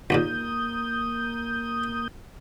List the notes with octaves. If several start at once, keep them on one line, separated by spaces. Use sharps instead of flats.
A#1 D#2 A#2 A#3 D#6 G6